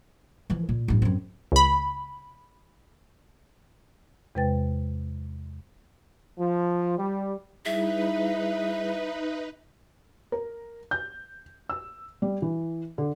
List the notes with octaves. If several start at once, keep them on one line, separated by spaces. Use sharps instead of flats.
E3 F3
A#2
A1 G2
F#2 C4
C#2 B5
E2 C3 G#3 B4 G5 A6
F3
G3
G3 D#4 E4 G#4 B4 E5
A#4
G6
E6
G3
E3
D3